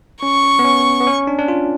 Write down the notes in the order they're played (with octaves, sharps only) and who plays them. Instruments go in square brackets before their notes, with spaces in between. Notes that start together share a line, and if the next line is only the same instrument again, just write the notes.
[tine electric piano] C#4 [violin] C#6
[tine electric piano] B3
C#4
B3
C#4
D4
D4
F4